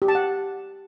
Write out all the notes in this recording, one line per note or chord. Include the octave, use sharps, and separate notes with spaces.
G4
A5
F#5